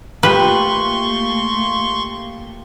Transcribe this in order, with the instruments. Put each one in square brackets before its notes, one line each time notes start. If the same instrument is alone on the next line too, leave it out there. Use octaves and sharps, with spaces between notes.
[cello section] A3 A#3 [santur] F4 G4 [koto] B4 [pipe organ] C6 C#6